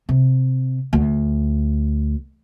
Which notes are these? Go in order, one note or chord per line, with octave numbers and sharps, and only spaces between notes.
C3
D2